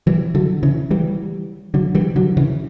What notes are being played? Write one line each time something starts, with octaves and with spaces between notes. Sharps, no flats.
E3 G3
D3 F#3
C#3 E3
E3 G3
D3 F#3
E3 G3
D3 F#3
C#3 E3